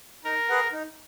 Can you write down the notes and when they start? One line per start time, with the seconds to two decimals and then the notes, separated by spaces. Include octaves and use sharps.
0.24 D#4 A#4
0.49 G#4 B4 F#5
0.73 D#4